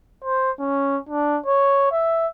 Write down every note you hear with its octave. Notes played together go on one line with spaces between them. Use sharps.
C5
C#4
D4
C#5
E5